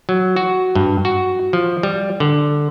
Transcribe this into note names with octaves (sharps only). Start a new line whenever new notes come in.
F#3
F#4
G2
F#4
F3
G3
D3